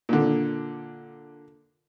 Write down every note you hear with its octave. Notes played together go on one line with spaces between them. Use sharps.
A#2 D3